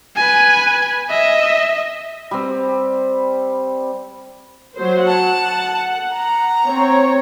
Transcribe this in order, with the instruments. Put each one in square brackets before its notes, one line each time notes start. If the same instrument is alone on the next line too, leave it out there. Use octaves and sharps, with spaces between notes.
[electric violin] B4 G#5
D#5 E5
[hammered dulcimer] G3 C4
[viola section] F#3 C5
[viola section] F#5 [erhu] A5
[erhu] A#5
[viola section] C4 C#5